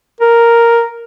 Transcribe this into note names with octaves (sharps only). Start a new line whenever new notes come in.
A#4